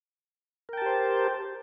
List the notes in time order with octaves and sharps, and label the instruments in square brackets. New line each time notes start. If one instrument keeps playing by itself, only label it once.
[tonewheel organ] A#4
G5
A5
G4
C5